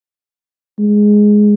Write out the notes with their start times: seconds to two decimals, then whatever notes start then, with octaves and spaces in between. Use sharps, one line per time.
0.79 G#3